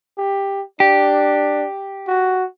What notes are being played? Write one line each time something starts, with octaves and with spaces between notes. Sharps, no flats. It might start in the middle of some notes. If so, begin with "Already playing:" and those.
G4
D4 G4
F#4